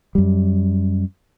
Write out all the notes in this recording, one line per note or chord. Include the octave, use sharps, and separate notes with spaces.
F#2 G3